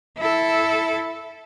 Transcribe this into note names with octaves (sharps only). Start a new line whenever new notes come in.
E4 A4